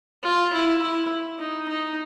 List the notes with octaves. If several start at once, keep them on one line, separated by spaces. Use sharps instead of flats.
F4
E4
E4
D#4
D#4